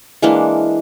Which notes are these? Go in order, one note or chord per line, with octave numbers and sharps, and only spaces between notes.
E3 G#3 A#3 D4